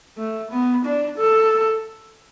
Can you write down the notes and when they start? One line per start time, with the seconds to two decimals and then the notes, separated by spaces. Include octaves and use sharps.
0.18 A3
0.51 B3
0.84 D4
1.17 A4